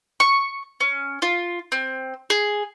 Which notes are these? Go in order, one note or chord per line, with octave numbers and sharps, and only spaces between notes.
C#6
C#4
F4
C4
G#4